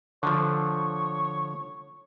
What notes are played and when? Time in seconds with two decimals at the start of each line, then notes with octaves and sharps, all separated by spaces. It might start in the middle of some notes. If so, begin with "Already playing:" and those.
0.23 D3 F3 C#5